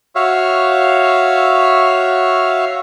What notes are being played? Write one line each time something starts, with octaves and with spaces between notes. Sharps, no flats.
F#4 C#5 E5 F5